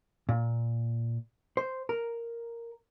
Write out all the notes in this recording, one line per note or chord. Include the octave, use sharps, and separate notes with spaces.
A#2
C5
A#4